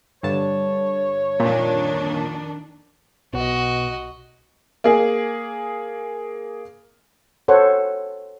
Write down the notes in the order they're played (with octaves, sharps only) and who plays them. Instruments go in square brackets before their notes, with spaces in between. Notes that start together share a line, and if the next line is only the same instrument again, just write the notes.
[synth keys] G2 D3 A5 [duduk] C#5
[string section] F2 D#3 D4 [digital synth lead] A#2
[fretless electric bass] B1 [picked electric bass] B2 [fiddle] F#4 D#5
[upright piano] A#3 G#4
[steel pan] A4 C5 C#5 F#5